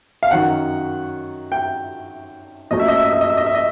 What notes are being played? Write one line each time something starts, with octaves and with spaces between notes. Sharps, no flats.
F5
F#2 D#3 F#3 F#5
G5
A#2 F#3 A3 C#4 D#5
E5
D#5
E5
D#5
E5
D#5
E5
D#5
E5
D#5